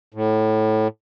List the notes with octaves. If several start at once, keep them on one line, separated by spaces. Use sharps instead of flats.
A2